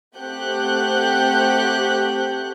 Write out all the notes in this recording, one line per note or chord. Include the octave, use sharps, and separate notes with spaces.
A3 C4 G4 F#5 F#6 G6